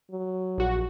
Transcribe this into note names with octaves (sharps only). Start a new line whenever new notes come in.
F#3
A#1 F#4